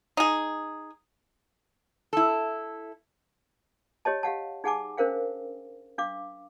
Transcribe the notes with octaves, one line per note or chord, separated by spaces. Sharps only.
D#4 G#4
E4 A4
G4 C#5 D#5 A5
G4 F5 F#5 A5
D#4 G#4 F#5 G#5 A5 D6
C#4 D4 A#4 C5 F5 G5
D4 F5 D6